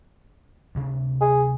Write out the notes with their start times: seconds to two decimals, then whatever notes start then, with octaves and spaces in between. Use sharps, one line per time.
0.75 D2 C3 D4
1.21 G#4